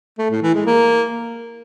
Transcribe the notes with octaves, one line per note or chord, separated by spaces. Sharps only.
A3
A2
E3
G#3
A#3